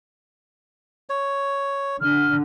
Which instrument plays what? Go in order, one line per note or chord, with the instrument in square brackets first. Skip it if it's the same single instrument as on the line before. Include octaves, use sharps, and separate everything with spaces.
[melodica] C#5
[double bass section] D3 [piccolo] F6